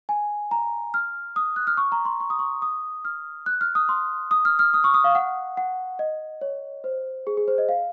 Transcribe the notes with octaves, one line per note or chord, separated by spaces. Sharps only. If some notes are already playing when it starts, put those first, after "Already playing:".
G#5
A#5
F6
D#6
F#6
F6
C#6
A#5
C6
C#6
D#6
C#6
D#6
F6
F#6
F6
D#6
C6
D#6
F6
F6
D#6
C#6
D#6
F5
F#5
F#5
D#5
C#5
C5
G#4
G#4
C5
D#5
F5